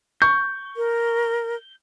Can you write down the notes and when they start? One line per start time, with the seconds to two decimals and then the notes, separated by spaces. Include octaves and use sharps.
0.22 C#6 G6
0.77 A#4